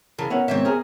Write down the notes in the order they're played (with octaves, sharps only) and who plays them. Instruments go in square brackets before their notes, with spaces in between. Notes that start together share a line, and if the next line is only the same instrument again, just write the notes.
[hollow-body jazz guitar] C#3 A#4 A5 [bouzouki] E3
[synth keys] B3 C#4 A#4 [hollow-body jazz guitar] C#5 E5 F#5
[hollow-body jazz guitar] G#2 D#3 [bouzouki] C4 C#5 E5
[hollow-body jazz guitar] G#4 A#4